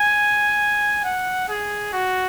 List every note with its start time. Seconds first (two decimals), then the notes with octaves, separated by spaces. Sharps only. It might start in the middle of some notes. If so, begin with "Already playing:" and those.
Already playing: G#5
1.04 F#5
1.49 G#4
1.93 F#4